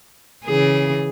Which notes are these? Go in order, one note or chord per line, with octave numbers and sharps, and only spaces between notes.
C#3 E3 G#4